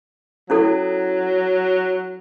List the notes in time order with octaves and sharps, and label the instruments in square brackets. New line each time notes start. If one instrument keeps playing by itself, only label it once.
[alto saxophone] F#3 [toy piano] C#4 E4 A4